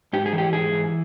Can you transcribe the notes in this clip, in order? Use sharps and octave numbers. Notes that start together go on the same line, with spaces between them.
G#2 G4
G#4
E3
G4
G#2 G#4
E3